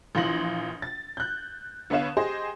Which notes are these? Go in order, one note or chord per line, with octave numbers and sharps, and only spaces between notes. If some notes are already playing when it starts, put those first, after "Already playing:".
A#1 E3 F4 C6 A#6 F#7
A6
F#6 G6
D3 B3 B4 C#5 F5 E7
G4 G#4 C5 D#5